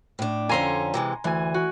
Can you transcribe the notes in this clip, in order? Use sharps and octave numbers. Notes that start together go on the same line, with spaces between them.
A2 D4
F2 D3 C#4 G#5 A#5 C6
C3 E3 G#3
D2 E3 G#5
F#4